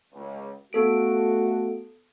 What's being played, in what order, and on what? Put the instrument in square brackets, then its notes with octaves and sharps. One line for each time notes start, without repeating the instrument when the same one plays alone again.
[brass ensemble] C#2
[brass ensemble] A3 F#4 [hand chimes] B3 A4 D7